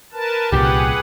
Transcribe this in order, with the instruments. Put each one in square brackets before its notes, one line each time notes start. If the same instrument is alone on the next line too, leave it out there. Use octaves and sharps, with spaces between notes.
[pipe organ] A#4 B4 A5
[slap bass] C2 A#2 C#3 [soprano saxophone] G4 [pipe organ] G#4 B4 F#5